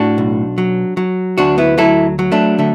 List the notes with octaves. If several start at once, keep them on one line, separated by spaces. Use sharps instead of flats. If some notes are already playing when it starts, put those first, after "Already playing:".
Already playing: A2 D4 F#4
B1
F#3
F#3
D2 D4 F#4
B3 E4
F#3 E4 A4
F#3
A3 D4
D3 A3